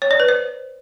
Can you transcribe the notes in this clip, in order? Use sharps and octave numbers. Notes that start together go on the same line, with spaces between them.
C#5
D5
B4
C5